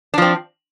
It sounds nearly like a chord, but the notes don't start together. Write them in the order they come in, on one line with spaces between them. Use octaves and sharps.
D4 F3 C4